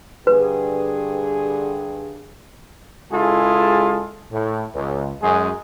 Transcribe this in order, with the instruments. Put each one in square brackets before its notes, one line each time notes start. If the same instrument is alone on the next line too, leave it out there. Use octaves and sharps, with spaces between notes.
[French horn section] G2 D3 G#4 [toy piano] B4
[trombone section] C#2 G#3 E4 F4 G#4 A4
A2
C#2
F#2 G#3 G#4